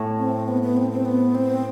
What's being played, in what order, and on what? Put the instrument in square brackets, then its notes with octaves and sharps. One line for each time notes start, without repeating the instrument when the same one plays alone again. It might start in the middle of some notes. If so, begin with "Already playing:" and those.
Already playing: [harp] A2
[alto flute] C4
B3
B3
C4
C4
B3
C4